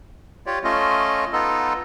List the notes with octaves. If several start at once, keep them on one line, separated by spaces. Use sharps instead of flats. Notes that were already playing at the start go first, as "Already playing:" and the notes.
F4 G4 C#5 D5
A3 C#4 F4 D#5
B3 D#4 F4 A4 D#5